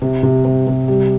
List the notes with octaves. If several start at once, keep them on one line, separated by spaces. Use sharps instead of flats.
C3
C3
C3
C3
G3